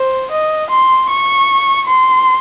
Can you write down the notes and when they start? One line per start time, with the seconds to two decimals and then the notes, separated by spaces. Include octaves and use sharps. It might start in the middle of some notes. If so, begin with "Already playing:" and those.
Already playing: C5
0.31 D#5
0.70 C6
1.09 C#6
1.87 C6